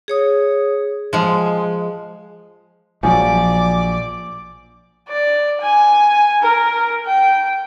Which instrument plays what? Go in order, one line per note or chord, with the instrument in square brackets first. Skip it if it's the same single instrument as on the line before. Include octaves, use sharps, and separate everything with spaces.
[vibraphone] G#4 C#5 D#6
[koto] F3 G#3
[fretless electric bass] A#1 [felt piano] F3 F#3 [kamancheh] D5 D6 [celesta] G#5
[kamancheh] D5
G#5
A#4
G5